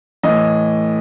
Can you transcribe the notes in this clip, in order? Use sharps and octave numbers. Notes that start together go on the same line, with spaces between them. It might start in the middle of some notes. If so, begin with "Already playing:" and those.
A2 E3 D#5